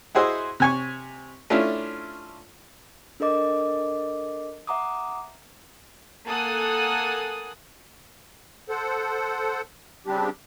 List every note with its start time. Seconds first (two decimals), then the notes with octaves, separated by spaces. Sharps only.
0.15 E4 F#4 G#4 C5 D#5 E5
0.60 C3 G#5 C#6
1.50 A3 C#4 D4 E4 F4
3.20 D4 A4 A#4 D#5 D6
4.67 E5 F#5 A#5 D6 D#6
6.26 A#3 A4 F#5 G#5 D#6 F#6
8.69 A4 C5 F#5
10.07 C#3 G3 C4 D4 G4